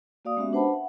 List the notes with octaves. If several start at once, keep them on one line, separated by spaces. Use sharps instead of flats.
A#3 F#4 D5 F5 D#6
G#3 B3 C#4 F#4 G4 E5
D4 B4 C5 F#5 A5 B5
E5 F#5 G5